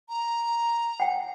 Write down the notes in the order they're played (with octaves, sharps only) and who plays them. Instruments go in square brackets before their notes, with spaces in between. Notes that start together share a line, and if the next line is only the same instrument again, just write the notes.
[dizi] A#5
[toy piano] F#5 G5